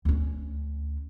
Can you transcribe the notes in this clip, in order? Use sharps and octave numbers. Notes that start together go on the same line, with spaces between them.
D2 C#4